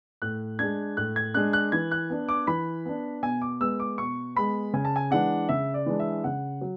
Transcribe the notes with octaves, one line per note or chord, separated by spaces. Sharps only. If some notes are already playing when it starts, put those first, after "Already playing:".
A2 F#6
G#3 D4 G#6
A2 F#6
G#6
G#3 D4 F#6
F#6
E3 G#6
F#6
B3 D4
D6
E3 B5
B3 D4
B2 G#5
D6
G#3 B3 E6
D6
B2 C#6
G#3 B3 B5
C#3 G#5
A5
G#5
E3 G#3 D4 F#5
C#3 E5
D5
E3 G#3 D4
E5
C#3 F#5
F#3